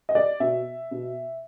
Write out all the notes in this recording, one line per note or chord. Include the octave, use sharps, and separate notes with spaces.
D#5
D5
B2 E5
B2